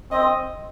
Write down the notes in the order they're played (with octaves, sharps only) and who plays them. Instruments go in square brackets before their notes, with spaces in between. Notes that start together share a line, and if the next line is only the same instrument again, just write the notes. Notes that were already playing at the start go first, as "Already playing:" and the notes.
[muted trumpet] C4 [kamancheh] D#5